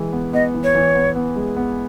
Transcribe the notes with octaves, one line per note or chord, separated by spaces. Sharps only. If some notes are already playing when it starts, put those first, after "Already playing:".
Already playing: E3 G#3
B3
B3 D#5
E3
C#5
E3
B3
B3
G#3
B3